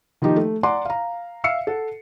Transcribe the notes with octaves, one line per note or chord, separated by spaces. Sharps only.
D#3 F3 A#3 D#4 G4
A3
D5 F#5 G#5 A#5 C6 D6
F5 A#5
E5 F5 E6 F6 C7 C#7
A4 F#5